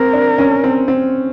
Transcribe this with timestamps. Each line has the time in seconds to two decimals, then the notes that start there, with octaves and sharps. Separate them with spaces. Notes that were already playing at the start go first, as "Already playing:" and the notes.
Already playing: C4 A#4
0.13 D4
0.38 C#4
0.64 C4
0.88 C4